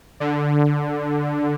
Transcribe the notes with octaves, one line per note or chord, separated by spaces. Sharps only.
D3